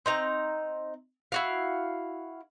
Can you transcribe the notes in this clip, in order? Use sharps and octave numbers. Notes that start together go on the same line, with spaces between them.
C4 D#4 A#5
E4 F#4 F5